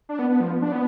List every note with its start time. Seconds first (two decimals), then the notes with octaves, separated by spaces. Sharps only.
0.09 D4
0.19 B3
0.30 B3
0.40 F3
0.62 D4
0.72 B3